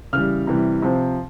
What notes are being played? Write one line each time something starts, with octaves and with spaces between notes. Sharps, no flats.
C#3 E3 G3 F6
C3 E3 G3
C3 F3